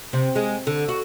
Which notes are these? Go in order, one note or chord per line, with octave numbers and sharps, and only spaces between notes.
C3
G#3
D3
F#4